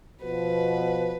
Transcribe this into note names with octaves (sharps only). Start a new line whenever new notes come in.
B2 F3 B4